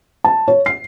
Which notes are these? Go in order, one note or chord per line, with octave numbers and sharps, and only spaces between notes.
A5
C#5
C7